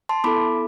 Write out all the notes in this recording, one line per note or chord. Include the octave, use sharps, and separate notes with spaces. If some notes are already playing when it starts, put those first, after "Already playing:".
A5 C6
B3 E4 A4 B5 D6